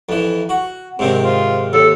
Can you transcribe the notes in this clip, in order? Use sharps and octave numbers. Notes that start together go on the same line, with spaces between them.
F2 E3
F#4
G#2 C3 D#3 C4
F4
D#2 A4